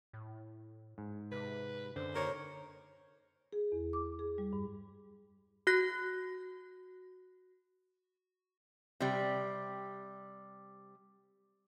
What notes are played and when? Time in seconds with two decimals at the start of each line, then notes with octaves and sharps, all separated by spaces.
0.13 A2
0.98 G#2
1.32 C3 B4
1.96 F#2 D3 C5
2.14 D#2 A#4 C#5
3.53 G#4
3.72 E2
3.93 D6
4.19 G#4
4.38 G3
4.53 G2
5.67 F#4 F#6 A#6
9.00 C3 G3